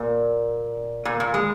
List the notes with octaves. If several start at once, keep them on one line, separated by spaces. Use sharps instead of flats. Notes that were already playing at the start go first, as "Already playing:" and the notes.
Already playing: A#2
A#2
A#2
G#3